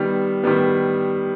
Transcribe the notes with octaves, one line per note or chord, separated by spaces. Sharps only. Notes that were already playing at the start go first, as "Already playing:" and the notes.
Already playing: D#3 G3 B3
D#3 G3 B3